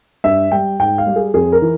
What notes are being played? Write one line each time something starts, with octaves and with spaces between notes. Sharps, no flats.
G2 E5
G3 G5
G#2 G5
F5
G3
G#4
F2 G#4
A#4
E3